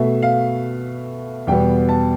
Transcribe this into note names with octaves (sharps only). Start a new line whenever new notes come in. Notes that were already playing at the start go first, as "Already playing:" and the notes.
Already playing: B2 A3 E5
F5
E2 B2 G3 B3 G5
A5